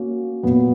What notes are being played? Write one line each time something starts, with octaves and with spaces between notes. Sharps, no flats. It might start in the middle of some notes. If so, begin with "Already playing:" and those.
Already playing: A#3 C#4 F#4
A#2 F#3 B3